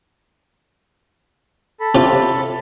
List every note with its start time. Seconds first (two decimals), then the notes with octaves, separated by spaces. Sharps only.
1.80 A4 B5
1.95 C3 F4